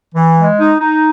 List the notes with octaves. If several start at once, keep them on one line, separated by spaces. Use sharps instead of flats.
E3
G#3
D#4
D#4